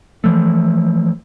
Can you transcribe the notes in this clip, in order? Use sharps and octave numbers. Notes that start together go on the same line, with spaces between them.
E3 F3 A3